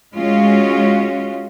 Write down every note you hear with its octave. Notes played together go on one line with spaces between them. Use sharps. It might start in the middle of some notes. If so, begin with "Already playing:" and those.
G#3 C#4 F4 F#4